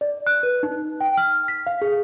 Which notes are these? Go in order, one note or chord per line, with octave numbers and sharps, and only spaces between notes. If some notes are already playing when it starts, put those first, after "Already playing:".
D5
F#6
B4
D#4
G5
F6
B6
F5
G#4